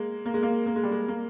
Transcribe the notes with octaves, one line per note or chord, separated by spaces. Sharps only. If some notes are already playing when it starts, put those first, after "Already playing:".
Already playing: G#3 A#3
A#3
G#3
A#3
A#3
G#3
G3
G#3
A#3